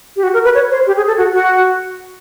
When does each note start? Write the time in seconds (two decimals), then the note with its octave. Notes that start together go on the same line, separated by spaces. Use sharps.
0.16 G4
0.23 F#4
0.34 A#4
0.44 B4
0.55 C#5
0.71 C5
0.87 G4
0.97 G#4
1.07 A4
1.18 F#4
1.33 F#4